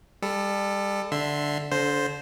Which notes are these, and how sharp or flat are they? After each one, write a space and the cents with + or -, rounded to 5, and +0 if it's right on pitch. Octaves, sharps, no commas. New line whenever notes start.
G3 +30 A4 +0
D3 +0 E5 +0 C6 +0
D3 -30 C5 +0